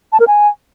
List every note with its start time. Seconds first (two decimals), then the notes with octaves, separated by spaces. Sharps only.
0.12 A5
0.20 A#4
0.27 G#5